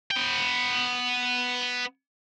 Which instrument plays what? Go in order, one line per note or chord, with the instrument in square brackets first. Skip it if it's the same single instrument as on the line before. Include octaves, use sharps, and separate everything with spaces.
[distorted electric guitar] B3 G5